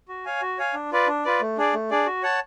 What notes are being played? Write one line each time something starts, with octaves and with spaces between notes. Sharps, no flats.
F#4
C#5 F5 G#5
F#4
C#5 F5 G#5
D4
F4 B4 D5
D4
F4 B4 D5
A3
D4 G#4 D5
A3
D4 G#4 D5
F#4
C#5 F#5 A5